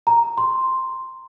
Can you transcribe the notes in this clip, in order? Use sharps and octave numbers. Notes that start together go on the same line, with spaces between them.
A#5
C6